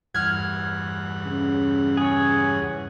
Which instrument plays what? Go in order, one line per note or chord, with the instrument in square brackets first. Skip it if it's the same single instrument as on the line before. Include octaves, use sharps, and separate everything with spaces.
[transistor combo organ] E2 G2 F#5 [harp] F6 G#6
[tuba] C#3
[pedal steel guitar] G#4 C#5